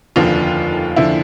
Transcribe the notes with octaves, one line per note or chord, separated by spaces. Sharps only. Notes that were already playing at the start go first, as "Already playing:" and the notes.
F1 D#2 D3 F3 F4
D3 F3 E4